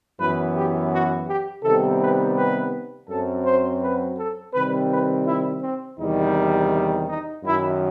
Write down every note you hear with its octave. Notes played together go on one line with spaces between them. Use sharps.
F#2 E3 B3 B4
G4
F#4
G4
C3 D#3 G3 B3 A4
B4
B4
F#2 F#3 C4 A4
C5
B4
A4
C3 D#3 G3 C4 B4
B4
E4
C4
E2 C3 D#3 G3 D#4
D#4
F#2 D#3 F#3 E4